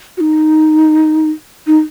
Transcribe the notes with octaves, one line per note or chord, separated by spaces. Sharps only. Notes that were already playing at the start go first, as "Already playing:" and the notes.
F#4
D#4
D#4